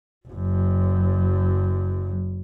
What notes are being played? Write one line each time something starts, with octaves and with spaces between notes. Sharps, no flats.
F#1 F#2